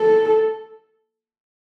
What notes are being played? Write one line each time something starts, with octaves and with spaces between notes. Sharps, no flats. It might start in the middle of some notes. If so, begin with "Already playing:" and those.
Already playing: A4